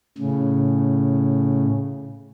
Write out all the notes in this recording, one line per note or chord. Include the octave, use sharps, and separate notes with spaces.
A2 C#3